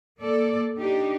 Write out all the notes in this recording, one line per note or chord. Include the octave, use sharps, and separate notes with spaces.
A#3 A4 D5
D4 D#4 G4